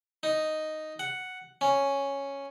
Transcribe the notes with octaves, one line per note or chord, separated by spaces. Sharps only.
D#4
F#5
C#4